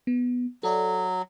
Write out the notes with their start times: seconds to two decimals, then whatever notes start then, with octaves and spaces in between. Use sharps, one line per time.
0.07 B3
0.63 F#3 A4 D5 E5